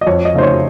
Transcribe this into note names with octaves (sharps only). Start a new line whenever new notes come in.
D#5
F2 C#5
D#5
C#3 A3 D#4 C5
C#5